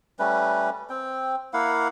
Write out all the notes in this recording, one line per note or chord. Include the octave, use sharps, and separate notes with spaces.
G3 A3 C#4 B4
C4 G5
A#3 E4 F5 F#5